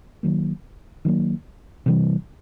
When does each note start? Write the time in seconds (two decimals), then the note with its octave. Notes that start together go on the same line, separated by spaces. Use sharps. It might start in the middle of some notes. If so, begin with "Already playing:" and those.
0.23 D#3 F#3 A#3
1.05 D#3 F#3 A#3
1.86 C3 E3 G3